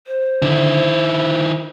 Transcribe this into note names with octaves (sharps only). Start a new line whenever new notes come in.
C5
D3 D#3 E4